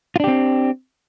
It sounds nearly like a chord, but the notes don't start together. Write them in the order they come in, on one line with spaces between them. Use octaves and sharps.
F4 D4 G4 C4